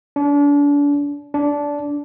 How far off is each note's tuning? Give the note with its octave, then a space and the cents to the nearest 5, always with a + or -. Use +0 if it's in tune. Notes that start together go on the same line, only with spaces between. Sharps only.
D4 -35
D4 -15